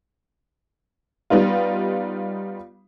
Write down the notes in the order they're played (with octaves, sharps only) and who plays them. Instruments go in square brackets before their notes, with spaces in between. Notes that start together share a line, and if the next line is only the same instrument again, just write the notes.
[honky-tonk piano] G3 B3 D#4 F4